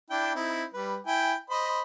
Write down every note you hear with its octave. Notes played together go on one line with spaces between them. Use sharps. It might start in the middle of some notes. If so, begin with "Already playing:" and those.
D4 E4 G5
C4 D#4 E4
G3 B4
E4 G5 G#5
C5 D#5 B5